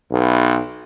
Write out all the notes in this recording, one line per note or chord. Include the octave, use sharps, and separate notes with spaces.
B1